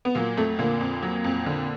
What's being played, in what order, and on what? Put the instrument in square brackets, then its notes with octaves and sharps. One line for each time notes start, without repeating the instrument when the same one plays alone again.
[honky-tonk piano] B3
A#2 F#3 A#3
F2 A3
A#2 D3 A#3
F2
F#3
F2
D3